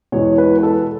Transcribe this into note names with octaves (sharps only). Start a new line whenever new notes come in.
E2 B2 G#3 C#5
B4
B4
A4